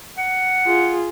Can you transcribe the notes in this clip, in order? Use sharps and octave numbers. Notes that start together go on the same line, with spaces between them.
F#5
F4 G#4